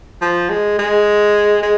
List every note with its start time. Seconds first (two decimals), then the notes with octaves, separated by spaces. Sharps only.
0.21 F3
0.50 G#3
0.78 G#3
1.63 G#3